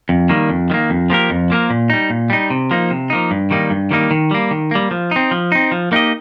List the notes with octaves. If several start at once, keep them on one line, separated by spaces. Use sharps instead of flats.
F2
D#3 G3 A#3
F2
D#3 G3 A#3
F2
F3 A#3 G4 A#4
F2
F3 A#3 G4 A#4
A#2
G3 D#4
A#2
G3 D#4
C3
F3 A#3 D#4
C3
F3 A#3 D#4
G2
D#3 G3 A#3 D#4
G2
D#3 G3 A#3 D#4
D#3
G3 A#3
D#3
G3 A#3
F3
C4 D#4
F3
C4 D#4
F3
A#3 D#4 G4 D#5